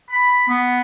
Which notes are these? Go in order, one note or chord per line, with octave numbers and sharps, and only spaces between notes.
B5
B3